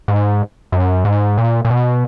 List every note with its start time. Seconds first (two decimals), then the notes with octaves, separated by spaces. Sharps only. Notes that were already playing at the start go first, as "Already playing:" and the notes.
0.08 G#2
0.72 F#2
1.05 G#2
1.37 A#2
1.65 A#2
1.70 B2